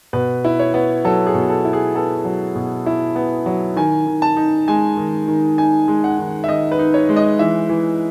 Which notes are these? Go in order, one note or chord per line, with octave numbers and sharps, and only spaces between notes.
B2 B4
E4
C#5
B3
F#3 A4
G#4
B2
A4
E4
G#4
B3 A4
F#3
B2
E4
B3
F#3
D#3 G#5
D#3
A5
D#4
G#3 G#5
D#3
D#3
D#4 G#5
G#3
F#5
D#3
E5
D#3 D#5
B4
D#4
C#5
G#3
D#5
E3 E5
E3